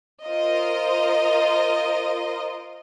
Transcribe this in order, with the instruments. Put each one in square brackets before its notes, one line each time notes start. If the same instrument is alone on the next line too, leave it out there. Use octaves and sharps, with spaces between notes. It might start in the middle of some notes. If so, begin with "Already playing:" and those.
[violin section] F4 A#4 C5 D#5